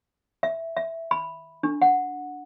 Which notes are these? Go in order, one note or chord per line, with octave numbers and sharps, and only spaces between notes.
E5
E5
B5
D4
F#5